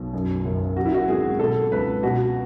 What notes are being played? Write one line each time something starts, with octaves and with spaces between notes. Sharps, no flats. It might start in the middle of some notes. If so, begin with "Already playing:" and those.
Already playing: B1 B2
F#2
F#1
F#2 F#4
E4
F#4
G#1 G#4
B2 A4
C#2 B4
B2 F#4